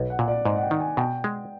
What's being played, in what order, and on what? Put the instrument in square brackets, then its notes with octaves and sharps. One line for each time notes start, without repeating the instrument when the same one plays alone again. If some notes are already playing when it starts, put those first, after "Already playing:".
Already playing: [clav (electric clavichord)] B1
[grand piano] F#5
[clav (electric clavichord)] A#2
[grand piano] D5
[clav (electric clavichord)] G#2 [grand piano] D#5
[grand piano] F#5
G5
[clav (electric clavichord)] D#3
[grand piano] G#5
[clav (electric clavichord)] B2 [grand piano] G5
[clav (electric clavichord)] G#3